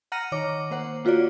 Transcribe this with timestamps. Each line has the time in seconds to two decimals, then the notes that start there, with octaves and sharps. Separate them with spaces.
0.12 F#5 A#5 F6 A#6 C#7 D#7
0.32 D#3 C#5 D6
0.71 A#3 C5 F#5
1.05 A#3 F4 F#4 C#5 D5